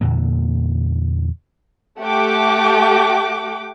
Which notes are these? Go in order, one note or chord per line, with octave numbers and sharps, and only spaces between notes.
E2 A#2 D3 A#3
A3 G4 F#5 G5 D6